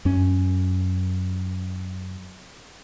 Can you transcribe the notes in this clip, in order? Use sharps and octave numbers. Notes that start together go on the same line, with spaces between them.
F#2 C#4